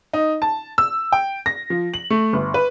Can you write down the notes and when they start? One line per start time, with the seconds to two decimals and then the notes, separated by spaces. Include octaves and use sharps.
0.13 D#4
0.42 A5
0.78 E6
1.12 G5
1.46 A#6
1.70 F3
1.94 F#7
2.10 A3
2.33 G1
2.54 B4